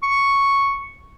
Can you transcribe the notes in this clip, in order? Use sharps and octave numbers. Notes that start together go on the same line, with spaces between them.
C#6